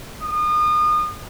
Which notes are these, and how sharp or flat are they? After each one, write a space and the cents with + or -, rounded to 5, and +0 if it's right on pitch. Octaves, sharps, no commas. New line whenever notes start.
D#6 -35